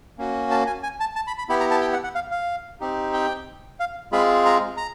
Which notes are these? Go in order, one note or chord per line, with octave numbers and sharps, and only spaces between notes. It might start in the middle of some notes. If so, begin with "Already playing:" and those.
A#3 C#4 F#4
A5
G#5
G#5
A5
A5
B5
B5
B3 E4 G4 B5
A#5
A5
G5
F#5
F#5
F5
F5
C4 D#4 G4
G5
F5
G#3 C4 F4 G#4 B5
A#5
A#5